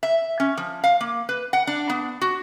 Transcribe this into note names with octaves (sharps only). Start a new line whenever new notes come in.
E5
C#4
F3
F5
A#3
B4
F#5
D4
B3
F#4